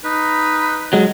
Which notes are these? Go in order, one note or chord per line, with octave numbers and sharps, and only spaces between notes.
D#4 B4
F#3 G#3